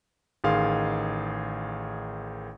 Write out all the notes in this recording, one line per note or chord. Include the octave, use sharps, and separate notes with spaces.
A1 D#3 G#4 F5 C6